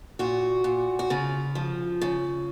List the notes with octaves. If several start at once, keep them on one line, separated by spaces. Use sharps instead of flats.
A#2 F#4
A#2
F#4
C#3 F4
F3
C#3